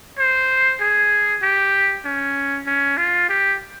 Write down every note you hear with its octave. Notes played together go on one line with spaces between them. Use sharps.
C5
G#4
G4
C#4
C#4
F4
G4